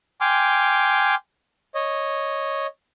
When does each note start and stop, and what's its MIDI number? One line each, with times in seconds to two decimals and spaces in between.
0.21 1.15 79
0.21 1.15 80
0.21 1.15 84
0.21 1.15 86
0.21 1.15 89
1.75 2.67 73
1.75 2.67 75